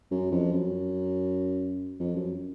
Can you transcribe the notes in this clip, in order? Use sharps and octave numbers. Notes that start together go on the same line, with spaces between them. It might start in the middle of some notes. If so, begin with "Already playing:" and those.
F#2
F2
F#2
F2
F#2